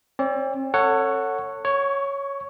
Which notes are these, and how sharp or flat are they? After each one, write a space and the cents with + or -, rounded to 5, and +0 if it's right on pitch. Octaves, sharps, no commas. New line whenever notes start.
C4 +40 D5 -35
A4 +30 C#5 +0 F#5 +0
C#5 +0 C#6 +25